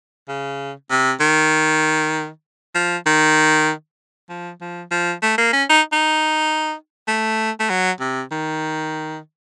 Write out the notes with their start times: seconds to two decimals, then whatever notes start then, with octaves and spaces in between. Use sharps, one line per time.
0.28 C#3
0.90 C3
1.20 D#3
2.75 F3
3.06 D#3
4.29 F3
4.61 F3
4.91 F3
5.22 A3
5.38 A#3
5.53 C#4
5.69 D#4
5.93 D#4
7.08 A3
7.59 A3
7.69 F#3
8.00 C3
8.31 D#3